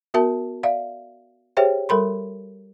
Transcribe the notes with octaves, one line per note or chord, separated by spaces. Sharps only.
B3 F#4 A#4 E5 A5
D5 E5 F5
G4 G#4 C5 C#5 E5 G5
G3 A4 A#4 B5 C6